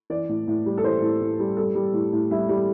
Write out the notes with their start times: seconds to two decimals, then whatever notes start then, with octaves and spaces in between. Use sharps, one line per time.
0.10 E3 D5
0.29 A2
0.48 A2
0.65 G3
0.78 A4
0.84 E3 C5
1.02 A2
1.21 A2
1.39 G3
1.57 G3 A4
1.75 G3
1.94 A2
2.13 A2
2.31 G3 E4
2.49 G3